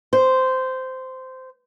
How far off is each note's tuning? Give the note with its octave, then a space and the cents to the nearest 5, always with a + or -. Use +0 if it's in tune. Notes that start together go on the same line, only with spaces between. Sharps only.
C5 -15